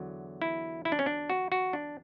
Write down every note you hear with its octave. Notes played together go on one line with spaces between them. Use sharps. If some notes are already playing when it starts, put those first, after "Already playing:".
Already playing: E2 D3 F#3
E4
E4
D4
C#4
D4
F#4
F#4
D4